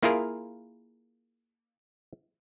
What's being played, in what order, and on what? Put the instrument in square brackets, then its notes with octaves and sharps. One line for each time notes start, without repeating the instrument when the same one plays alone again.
[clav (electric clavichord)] A#3 E4 F4 G#4 A#4